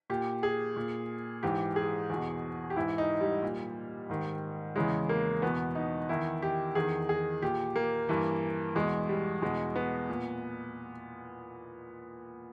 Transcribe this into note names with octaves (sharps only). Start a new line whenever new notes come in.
A#2 G4
G#4
A#2
G#2 E3 G4
G#4
E2 B2
G4
G#2 E3 E4
D#4
G3
A#2
G#2 D#3
E2 C#3 E3 G#3
A#3
E2 B2 B3
D#4
E2 D#3 E4
G4
E2 D#3 G#4
G#4
A#2 G4
A#3
G2 E3
E2 B2 G#3
G3
E2 B2 G#3
B3
A#2